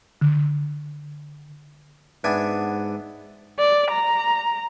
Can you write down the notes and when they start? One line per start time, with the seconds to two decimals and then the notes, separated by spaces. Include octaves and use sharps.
0.21 D3
2.24 G#2 B3 D4 E5 F#5 G#5
3.59 D5
3.91 A#5